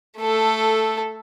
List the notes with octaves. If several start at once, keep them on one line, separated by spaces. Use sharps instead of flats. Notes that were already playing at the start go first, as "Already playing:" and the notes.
A3 A4